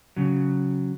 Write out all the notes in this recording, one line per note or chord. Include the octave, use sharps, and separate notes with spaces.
C#3 F#3